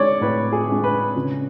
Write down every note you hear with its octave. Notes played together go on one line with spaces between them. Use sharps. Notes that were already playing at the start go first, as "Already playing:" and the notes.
Already playing: G#3 D4 C#5 D5
A2 B4
G#4
G#3 D4
B4
C#3